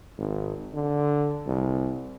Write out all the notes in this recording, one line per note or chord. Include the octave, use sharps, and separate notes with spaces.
G#1
D3
C2